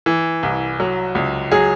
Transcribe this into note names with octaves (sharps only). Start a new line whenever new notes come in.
E3
C2
F#3
C#2
F#3 G#4